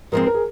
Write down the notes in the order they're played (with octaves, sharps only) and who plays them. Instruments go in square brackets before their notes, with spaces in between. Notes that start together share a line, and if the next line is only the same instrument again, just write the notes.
[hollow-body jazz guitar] G#2 F3 G#3 C4 [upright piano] A#4
[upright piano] A#4
G#4